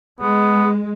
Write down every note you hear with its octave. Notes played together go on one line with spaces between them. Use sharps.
G#3 B3